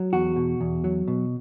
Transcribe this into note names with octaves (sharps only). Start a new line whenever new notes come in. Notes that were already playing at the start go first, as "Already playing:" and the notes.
Already playing: F#3
E2 F#4
B2
E2
F#3
B2